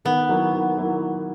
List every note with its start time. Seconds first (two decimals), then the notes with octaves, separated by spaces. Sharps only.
0.05 D#3 B3
0.29 F#3 A#3 E4
0.54 D#3
0.78 F#3 A#3 E4